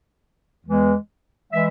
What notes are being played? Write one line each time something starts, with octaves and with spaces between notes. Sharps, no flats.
E2 E3 G#3
E3 G#3 E5